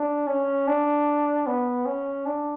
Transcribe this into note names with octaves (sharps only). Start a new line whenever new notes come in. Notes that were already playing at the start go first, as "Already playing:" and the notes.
Already playing: D4
C#4
D4
B3
C#4
D4